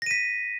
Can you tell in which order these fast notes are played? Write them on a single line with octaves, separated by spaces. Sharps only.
A#6 D#7 B6